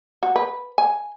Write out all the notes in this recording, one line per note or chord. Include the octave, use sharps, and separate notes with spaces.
F#4
B4
G#5